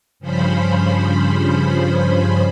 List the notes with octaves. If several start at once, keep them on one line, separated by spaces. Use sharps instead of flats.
G2 C#3 F3 C#4 C5 B5